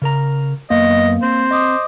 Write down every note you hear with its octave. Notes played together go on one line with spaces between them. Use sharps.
C#3 A#4 A#5
F#2 A#3 B3 D#5
C4 C5
D#5 D6 D#6